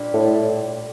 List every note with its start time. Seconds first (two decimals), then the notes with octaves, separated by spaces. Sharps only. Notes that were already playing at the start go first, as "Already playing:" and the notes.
Already playing: A#2 G3 D4
0.14 A2